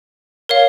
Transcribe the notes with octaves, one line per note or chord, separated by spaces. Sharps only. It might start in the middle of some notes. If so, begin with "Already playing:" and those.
A#4 C#5 F5